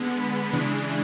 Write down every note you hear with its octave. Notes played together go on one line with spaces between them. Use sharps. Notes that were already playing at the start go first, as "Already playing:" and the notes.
Already playing: D3 G#3 B3
B5
C#3 E3 G#3 D4 B5